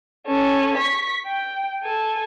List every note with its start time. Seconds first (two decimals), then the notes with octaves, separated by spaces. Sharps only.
0.27 C#4 A4
0.75 C#6 B6
1.27 G5
1.83 A4 G#5